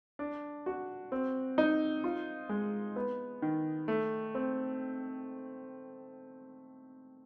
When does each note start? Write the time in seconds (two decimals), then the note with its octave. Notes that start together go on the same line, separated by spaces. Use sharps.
0.19 D4
0.66 F#4
1.12 C4
1.58 D#4
2.04 F4
2.49 G#3
2.96 B3
3.42 D#3
3.88 A3
4.35 C4